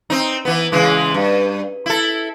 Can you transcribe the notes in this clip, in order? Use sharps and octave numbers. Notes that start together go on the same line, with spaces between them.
C4 D#4
E3 B3
C#3 E3 G#3
G2
E4 A4